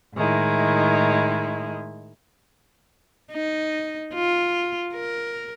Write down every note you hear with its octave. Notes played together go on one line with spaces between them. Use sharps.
A2 D#3 G#3 E4
D#4
F4
A#4